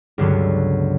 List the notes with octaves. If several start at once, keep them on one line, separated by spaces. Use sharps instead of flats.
C#2 G2 D3 F#3 B3